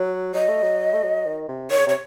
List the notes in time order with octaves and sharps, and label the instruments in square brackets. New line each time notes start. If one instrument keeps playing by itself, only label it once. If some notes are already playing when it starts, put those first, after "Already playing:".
Already playing: [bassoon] F#3
[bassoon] F#3 [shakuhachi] D#5
[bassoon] A3
F#3
A3
F#3
D#3
C3
[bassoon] D#3 [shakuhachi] C#5
[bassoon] C#3
[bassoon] C3 [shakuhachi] C#5